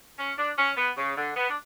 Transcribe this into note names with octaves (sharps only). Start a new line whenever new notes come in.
C#4
D4
C#4
B3
C#3
D3
B3
D4